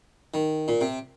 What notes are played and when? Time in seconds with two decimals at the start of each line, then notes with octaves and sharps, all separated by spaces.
0.34 D#3
0.68 A#2
0.81 C3